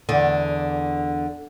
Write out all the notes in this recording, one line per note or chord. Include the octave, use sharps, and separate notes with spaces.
E2 D3